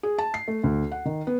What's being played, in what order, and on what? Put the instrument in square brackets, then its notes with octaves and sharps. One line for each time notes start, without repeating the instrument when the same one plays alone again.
[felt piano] G#4
A5
C7
A3
D2
F#5
D#3
B3